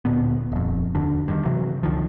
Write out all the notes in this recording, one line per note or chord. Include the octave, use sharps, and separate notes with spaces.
D1 A#2 D3 B3
D#1 F2
D#2 D3 D4
G2 D#3
C3 E3 F#3
C#2 D3 D#3 F3